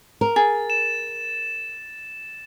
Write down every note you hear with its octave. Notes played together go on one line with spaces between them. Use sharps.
A#4
G#4 A6
E7